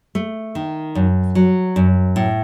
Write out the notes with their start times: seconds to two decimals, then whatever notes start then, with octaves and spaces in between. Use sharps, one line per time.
0.15 A3
0.55 D#3
0.95 F#2
1.35 F#3
1.76 F#2
2.16 A2